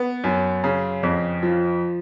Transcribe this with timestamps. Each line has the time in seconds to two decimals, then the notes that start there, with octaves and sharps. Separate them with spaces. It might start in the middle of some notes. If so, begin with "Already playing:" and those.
Already playing: B3
0.24 F#2
0.64 C#3
1.03 F2
1.43 F3